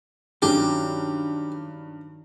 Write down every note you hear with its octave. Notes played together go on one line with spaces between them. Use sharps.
G2 D#3 F#3 C#4 G4